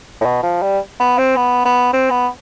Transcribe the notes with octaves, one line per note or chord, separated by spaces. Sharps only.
A2
B2
F3
G3
B3
C4
B3
B3
C4
B3